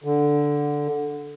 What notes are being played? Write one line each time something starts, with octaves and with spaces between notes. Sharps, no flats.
D3